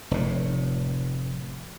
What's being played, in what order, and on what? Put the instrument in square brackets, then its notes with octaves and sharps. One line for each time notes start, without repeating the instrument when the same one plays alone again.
[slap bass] F1 A2